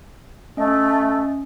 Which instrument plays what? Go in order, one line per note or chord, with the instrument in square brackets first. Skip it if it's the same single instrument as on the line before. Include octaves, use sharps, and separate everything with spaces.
[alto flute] A3 [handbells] C#4 D#5